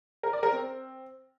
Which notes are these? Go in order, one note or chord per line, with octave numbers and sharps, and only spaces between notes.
A#4
D5
A#4
C4